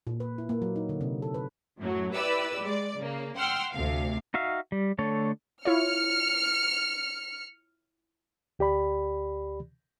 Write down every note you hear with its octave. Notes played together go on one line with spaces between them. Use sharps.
A#2
B4
E4
A#3
F#3
D#4
D3
C3
A4
B4
F#2 A2 F#3
E4 G4 B4 D5 E6
G#3 D5
C#3 A#3
F#5 G5 C6 E6 F6
D2 C3 F5
D#4 F#4 E5 F5
G3
D3 A3 A4 C#5
E4 F4 C#5 F6 C#7
D2 G4 D5 B5